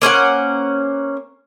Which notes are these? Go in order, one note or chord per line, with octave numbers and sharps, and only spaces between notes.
A#3 C#4 C5 F#5